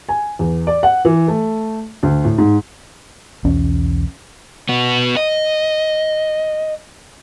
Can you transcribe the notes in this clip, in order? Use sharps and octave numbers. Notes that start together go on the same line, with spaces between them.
G#5
E2
D5
F#5
E3
A3
D2
A2
G#2
B1 E2 C#4
B3 F#4
D#5